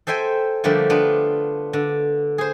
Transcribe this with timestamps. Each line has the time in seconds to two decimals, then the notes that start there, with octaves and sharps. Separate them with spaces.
0.07 A4 C5 E5 G5 G#5
0.64 D3 F3 G3 A3 A#3
0.90 B3 D4 F4
1.73 D3
2.38 G#4 C5